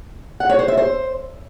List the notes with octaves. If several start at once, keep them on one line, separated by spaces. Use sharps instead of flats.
F#5
C#5
C5
E5
C5